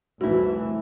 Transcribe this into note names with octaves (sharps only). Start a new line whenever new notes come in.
F1 C2 A2 E3 E4 F#4